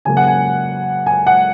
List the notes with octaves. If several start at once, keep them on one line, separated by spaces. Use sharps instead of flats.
C#3 F#3 A#3 G#5
F#5
G#5
G#5
F#5